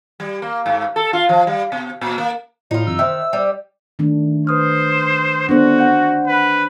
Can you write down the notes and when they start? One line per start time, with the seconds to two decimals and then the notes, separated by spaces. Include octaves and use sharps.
0.20 G3
0.42 A#3
0.66 G#2
0.96 A4
1.13 F4
1.29 F3
1.47 G3
1.72 B2
2.01 A#2
2.18 A#3
2.71 A2 D#4 F4
2.87 F#2 C3 E3 E6
2.99 D#3 C5 E5
3.33 G3
3.99 D#3 A3 D4
4.47 B4 C5 D#6 F6
5.49 B3 D4 F#4 A4 C5
5.79 F#5 G6
6.27 B4